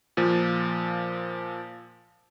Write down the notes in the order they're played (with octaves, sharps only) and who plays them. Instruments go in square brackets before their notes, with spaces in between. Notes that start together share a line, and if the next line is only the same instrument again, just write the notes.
[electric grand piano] A#2 F3